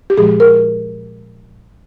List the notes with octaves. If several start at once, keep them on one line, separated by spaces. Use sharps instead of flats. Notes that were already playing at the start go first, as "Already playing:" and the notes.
G4
A#2 F3 G#3 G#4
A#4